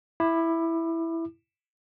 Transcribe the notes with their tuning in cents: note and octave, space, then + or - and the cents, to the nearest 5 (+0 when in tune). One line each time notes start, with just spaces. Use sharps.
E4 +0 D6 +30